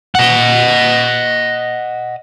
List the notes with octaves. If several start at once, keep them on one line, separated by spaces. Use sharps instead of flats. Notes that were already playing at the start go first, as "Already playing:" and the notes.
D#5 F#5